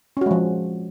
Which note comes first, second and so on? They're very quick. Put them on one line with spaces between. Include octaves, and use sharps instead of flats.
C#4 F#4 G#3 F3